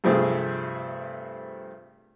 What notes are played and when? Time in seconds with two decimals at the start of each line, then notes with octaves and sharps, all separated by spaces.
0.04 G2 C3 F3 A3 C4 G#4